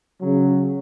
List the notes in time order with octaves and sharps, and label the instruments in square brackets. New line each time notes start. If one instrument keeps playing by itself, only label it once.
[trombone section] C#3 F#3